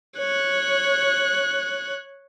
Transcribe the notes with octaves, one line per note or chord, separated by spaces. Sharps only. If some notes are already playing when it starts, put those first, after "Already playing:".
C#5 F#6